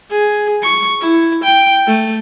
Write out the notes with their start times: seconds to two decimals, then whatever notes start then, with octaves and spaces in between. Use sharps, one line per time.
0.10 G#4
0.62 C#6
1.01 E4
1.44 G5
1.87 A3